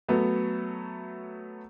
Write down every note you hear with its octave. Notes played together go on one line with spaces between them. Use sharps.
F#3 A3 B3